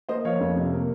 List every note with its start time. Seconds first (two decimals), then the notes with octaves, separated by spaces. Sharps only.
0.09 A#3 C5 D#5
0.25 F3 C#5 F5
0.40 F2
0.56 C3
0.72 A#3